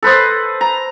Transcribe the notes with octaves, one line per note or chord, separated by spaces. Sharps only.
A4 B4 C5 D#5
A#5